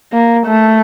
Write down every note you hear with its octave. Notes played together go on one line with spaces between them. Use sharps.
A#3
A3